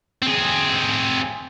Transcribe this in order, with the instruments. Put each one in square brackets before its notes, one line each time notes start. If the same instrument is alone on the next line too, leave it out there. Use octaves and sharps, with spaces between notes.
[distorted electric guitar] C4 G#4